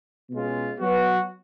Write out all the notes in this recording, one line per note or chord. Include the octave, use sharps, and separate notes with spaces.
B2 G#3 C#4 F4
F#3 B3 F#4